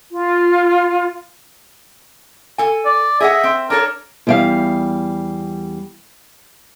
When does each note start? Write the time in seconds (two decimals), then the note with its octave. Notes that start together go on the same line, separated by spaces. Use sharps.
0.12 F4
2.58 A4 G#5
2.85 D5
3.20 G#4 D#5 E5 F#5
3.44 C4
3.70 D4 A4 A#4 C#5
4.27 E2 G3 F5